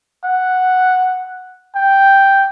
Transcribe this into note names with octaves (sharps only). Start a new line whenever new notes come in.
F#5
G5